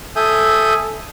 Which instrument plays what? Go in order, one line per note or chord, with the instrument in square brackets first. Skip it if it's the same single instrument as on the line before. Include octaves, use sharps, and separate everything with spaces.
[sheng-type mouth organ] A4 E5 G#5 D#6 G6